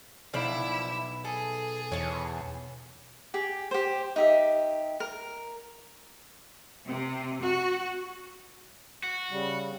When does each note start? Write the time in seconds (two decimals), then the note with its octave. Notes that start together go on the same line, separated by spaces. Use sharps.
0.34 B1 F3 D4 E4 D5 E5
1.25 G#4 A4
1.92 E2 C#5 A5
3.34 G4 G#4
3.71 G4 C5
4.16 D#4 G4 E5
5.00 A#4
6.85 C3
7.41 F#4
9.04 F#4
9.31 C#3 G3